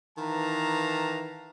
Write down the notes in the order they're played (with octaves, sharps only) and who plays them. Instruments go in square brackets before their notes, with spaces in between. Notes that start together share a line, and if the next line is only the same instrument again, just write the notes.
[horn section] D#3 E3 B4 F5 A5 A#5